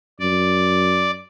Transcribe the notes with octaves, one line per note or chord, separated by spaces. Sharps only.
F#2 D5